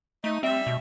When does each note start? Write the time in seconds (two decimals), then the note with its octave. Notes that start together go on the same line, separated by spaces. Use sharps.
0.24 A3 D#4
0.43 G3 C4 E5
0.67 B2